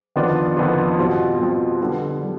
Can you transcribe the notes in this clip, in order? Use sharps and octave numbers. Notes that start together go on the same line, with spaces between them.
F2 D#3 B3 D4 F4
F2 D#3 B3 D4 F4
B2 G3 C4 F4
B2 G3 C4 F4
D3 G3 B3
D3 G3